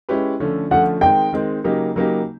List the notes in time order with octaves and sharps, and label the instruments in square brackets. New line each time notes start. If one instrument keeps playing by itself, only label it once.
[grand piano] G#3 C#4 E4 G4 B4
D3 F3 A3 C#4
[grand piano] D3 F3 A3 C#4 [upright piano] F#5
[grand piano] D#3 G#3 C4 D#4 [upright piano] G5
[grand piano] D#3 G#3 C4 D#4
C#3 F#3 A#3 D#4 G4
C#3 F#3 A#3 D#4 G4